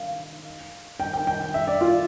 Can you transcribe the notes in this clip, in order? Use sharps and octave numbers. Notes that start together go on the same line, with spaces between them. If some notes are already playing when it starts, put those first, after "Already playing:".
Already playing: F5
G5
G5
G5
E5
D5
F4